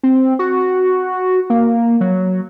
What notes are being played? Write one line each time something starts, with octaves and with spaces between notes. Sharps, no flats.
C4
F#4
A#3
F#3